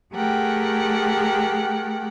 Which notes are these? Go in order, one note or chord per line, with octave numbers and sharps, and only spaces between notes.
A3 G4 G#4 A#4 F#5 G5